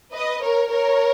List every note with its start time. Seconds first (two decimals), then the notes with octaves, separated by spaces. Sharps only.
0.14 B4 D#5
0.42 A#4 C#5
0.71 A#4 C#5